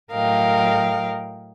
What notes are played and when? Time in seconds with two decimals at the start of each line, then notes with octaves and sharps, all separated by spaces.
0.11 A2 F#3 A#4 D#5 F5 G5